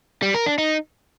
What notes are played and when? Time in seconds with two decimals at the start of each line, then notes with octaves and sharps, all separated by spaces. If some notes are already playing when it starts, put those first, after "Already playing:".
0.22 G3
0.34 A#4
0.46 D4
0.58 D#4